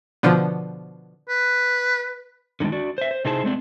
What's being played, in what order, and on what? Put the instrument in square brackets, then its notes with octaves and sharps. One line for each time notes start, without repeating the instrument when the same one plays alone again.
[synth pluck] B2 D3 F3
[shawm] B4
[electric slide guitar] D3 D#3 F3 G#3 D4
D4 F#4 D5
C5 E5
C5
C3 D#4 E4 G#4 C5 A5
G#3 A3 C4 D4